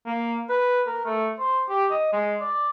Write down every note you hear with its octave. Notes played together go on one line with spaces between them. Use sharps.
A#3
B4
A#4
A3
C5
G4
D#5
G#3
D5